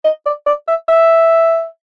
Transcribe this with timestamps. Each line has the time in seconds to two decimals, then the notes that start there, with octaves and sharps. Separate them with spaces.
0.04 D#5
0.26 D5
0.46 D5
0.67 E5
0.88 E5